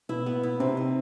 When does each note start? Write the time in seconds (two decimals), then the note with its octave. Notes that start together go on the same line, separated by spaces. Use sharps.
0.09 B2 E4
0.26 B3
0.43 E4
0.60 C3 C4
0.77 D#4